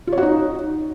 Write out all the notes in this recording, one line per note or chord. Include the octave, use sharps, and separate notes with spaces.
F4
C#5
F#4
D#4